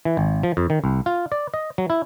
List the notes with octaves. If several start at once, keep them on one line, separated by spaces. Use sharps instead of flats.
E3
G#1
F3
F2
D#3
C2
F4
D5
D#5
F#3
E4